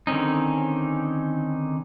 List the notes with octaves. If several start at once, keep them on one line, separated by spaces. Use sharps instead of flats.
D3 D#3 C4 C#4 D#4